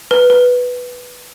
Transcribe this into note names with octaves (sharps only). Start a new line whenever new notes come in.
B4
B4